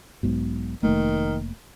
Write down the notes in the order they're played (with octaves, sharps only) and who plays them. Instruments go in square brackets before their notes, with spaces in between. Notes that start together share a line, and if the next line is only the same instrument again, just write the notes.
[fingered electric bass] B1 G#2 B2
[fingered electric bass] F1 A3 A#3 [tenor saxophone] D#3